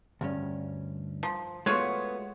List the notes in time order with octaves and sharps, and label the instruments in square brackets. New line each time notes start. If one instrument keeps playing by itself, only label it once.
[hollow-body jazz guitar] D2 G2 C#4
[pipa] F3
[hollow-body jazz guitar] G#3 A3 B3 [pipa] F4 F#4 C#5